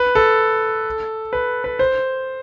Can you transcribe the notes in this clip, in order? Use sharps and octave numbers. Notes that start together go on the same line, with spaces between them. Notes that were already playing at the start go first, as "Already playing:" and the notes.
Already playing: B4
A4
B4
B4
C5